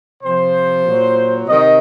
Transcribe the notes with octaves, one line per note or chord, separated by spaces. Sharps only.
C3 F3 C5
A#2 F#3
C3 D#3 D#5